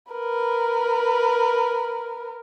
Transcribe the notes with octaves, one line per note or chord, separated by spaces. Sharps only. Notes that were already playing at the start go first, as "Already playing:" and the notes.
A#4 B4